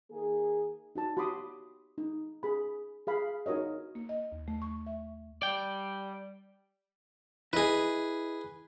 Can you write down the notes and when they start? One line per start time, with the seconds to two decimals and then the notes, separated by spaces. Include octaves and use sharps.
0.10 D#3 A#3 G#4
0.95 D#4 F#4 A5
1.17 F#4 G4 B5 C6 D6 D#6
1.98 D#4
2.43 G#4 B5
3.07 G#4 F5 B5
3.46 D#4 F#4 A#4 C#5 D#5
3.95 A#3
4.09 D#5
4.32 D#2
4.48 A3
4.62 C#6
4.86 E5
5.42 G3 D5 G5
7.53 E4 G#4 B4 D#5